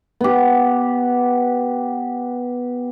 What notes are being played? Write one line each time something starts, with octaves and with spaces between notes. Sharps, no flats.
B3 G4